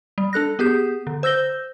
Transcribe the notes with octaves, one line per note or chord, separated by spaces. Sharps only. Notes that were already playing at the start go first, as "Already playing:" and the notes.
G3
D4 A4 F#6 A#6
B3 G4 G#4 G6
D3
C5 E6 G6 A#6 G7